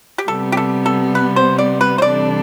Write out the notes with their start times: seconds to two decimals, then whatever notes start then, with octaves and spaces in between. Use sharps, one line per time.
0.18 G4
0.28 C3 G3 B3 A4
0.52 G4
0.57 A4
0.86 A4
1.15 B4
1.36 C5
1.58 D5
1.81 B4
1.98 C5
2.02 C3 E3 G3 D4 A4 D5